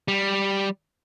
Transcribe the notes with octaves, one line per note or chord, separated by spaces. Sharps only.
G3